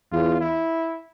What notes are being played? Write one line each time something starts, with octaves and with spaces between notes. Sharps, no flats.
E2 F4
E4